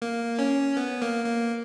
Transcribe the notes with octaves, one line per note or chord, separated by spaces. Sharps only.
A#3
C#4
B3
A#3
A#3